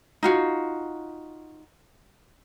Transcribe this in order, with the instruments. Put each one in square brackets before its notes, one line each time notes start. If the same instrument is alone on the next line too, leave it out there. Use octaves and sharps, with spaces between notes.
[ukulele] D#4 F4 F#4